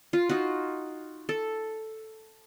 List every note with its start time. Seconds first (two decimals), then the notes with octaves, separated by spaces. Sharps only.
0.13 F4
0.29 D#4 F4 F#4
1.29 A4